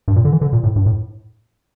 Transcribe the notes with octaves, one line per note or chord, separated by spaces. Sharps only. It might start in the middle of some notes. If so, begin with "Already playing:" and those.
G2
A#2
D3
E3
D3
A#2
A2
G2
A2